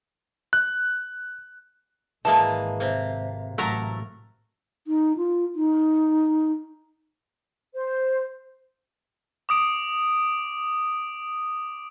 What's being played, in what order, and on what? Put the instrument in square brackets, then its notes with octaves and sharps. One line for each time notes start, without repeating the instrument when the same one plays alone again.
[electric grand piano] F#6
[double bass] G#1 [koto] E3 G#3 A#3 [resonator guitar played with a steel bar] A5
[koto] C3 A#3
[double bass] A1 [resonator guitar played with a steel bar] F#3 A3 A#5 [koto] A#4
[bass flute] D#4
F4
D#4
[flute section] C5
[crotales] D6 D#6 D7